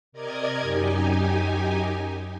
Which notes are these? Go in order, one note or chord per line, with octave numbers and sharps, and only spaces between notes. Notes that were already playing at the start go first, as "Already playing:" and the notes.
C3 A#4 D5 D#5 G#6
F#2 D#4 G4 G#5